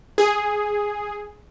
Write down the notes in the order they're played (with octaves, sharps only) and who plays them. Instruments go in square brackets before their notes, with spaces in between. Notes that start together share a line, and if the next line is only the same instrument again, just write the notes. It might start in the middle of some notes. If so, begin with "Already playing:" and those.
[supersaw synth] G#4